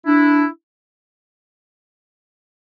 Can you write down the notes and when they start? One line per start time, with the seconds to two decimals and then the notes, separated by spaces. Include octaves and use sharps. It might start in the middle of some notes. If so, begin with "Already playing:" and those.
0.06 D4 E4